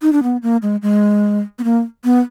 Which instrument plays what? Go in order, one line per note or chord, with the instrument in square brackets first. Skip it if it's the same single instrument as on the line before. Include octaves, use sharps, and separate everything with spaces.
[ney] D#4
D4
B3
A#3
G#3
G#3
B3
A#3
B3